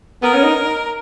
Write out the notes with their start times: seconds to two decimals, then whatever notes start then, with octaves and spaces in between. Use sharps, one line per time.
0.23 B3 A#4
0.33 C#4
0.44 D#4